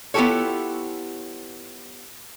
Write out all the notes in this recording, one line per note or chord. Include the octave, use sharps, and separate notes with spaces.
B3 E4 F4 G4 A4 C#5